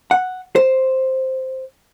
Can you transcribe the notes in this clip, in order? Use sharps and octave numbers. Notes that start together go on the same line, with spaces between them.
F#5
C5